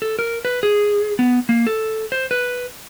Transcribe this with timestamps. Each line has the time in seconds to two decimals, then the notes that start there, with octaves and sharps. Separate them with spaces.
0.02 A4
0.19 A#4
0.45 B4
0.63 G#4
1.19 B3
1.49 A#3
1.67 A4
2.12 C5
2.31 B4